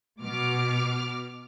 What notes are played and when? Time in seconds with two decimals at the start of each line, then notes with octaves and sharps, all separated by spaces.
0.21 B2 D6 F6